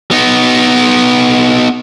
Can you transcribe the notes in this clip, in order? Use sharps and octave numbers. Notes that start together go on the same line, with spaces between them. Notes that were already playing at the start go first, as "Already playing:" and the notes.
B3 D#4